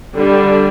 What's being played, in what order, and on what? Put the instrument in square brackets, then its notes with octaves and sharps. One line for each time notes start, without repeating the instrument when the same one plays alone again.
[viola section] D3 G3 D4